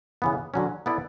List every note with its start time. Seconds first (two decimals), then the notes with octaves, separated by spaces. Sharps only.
0.22 C#3 E3 B3
0.54 D3 F#3 C#4
0.86 B3 E4 A4 D5